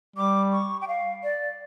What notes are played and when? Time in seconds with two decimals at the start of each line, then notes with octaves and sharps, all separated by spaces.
0.16 G3 D6
0.52 C#6
0.81 G5
0.88 F5
1.23 D5